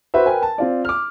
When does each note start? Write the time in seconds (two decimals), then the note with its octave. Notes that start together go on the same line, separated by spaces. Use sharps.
0.14 F#4 B4 C5 E5
0.26 A#4 B4 G5 G#5
0.42 A5
0.58 C4 F4 D5
0.85 D6 F6